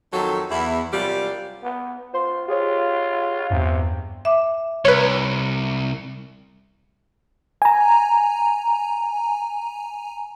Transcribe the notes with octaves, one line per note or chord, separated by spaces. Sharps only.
F2 D#3 F#3 F#4 A4
E2 E4
F#2 C3 G3 F4 G4 D5
B3
F4 C5 C6
F4 G4 G#4 C#5
E2 G2 C3
E5 D6
C2 B4 C#5
G#5 A#5